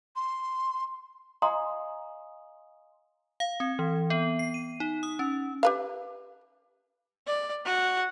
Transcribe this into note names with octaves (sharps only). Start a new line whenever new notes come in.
C6
D#5 F5 G#5 A#5 C6 D#6
F5
C4
E3
B3
C7
D#7
D#4
D#6
C#4
G4 B4 F5
D5
F#4